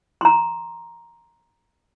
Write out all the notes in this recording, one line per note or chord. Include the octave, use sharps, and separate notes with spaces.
A#5 C6